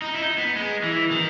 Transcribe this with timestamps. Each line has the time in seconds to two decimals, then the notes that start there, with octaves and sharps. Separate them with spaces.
0.02 D#4
0.15 E4
0.20 D#4
0.38 B3
0.56 G#3
0.84 E3
1.11 D#3